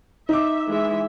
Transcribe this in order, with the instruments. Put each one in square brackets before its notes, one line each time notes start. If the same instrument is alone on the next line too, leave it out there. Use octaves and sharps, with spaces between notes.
[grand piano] D#4 D6 [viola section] E5
[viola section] E3 G#3 E5